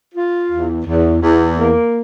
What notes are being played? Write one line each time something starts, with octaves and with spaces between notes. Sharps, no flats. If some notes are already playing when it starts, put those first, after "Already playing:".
F4
E2
E2
E2
A#3